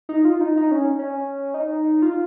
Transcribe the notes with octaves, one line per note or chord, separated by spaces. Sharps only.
D#4
F4
D#4
D#4
C#4
C#4
D#4
F4